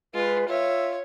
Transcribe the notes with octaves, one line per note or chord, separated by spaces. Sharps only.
G#3 F4 B4
F4 C#5 E5